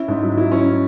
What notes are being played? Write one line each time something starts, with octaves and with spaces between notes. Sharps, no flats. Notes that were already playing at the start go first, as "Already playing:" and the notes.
Already playing: C#4 E4
G#2
F#3
E4
C#4